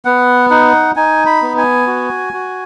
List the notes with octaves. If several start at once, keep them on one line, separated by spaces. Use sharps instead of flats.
B3 F#5
D#4 F#5
D#4 G#5
B5
B3
G#5
F#4
F#4